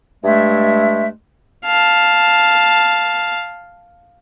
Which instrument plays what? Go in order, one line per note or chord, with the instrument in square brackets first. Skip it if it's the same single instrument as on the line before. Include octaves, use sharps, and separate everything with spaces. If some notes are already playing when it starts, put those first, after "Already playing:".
[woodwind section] G2 G#3 A3 E5
[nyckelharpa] F5 A5